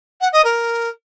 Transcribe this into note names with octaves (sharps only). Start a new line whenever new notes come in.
F#5
D#5
A#4